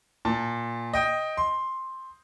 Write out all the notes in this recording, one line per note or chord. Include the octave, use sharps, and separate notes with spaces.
A#2 A5
D#5 G5
C6